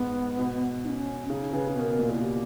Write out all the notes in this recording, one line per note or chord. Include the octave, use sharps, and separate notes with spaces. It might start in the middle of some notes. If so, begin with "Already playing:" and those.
Already playing: G#2 B3
B2
D#4
C#4
C#3 D#4
C#3 B4
C#3
B2 A#4 B4
B2
A#2
E4
G4